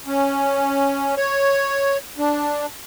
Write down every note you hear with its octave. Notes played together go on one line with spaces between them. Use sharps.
C#4
C#5
D4